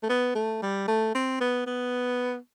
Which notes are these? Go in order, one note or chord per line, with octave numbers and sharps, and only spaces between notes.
A3
B3
A3
G3
A3
C4
B3
B3